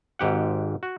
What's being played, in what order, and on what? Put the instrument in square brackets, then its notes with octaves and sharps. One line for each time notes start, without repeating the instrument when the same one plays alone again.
[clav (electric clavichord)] G#1 G#2 G4 F#5
F#4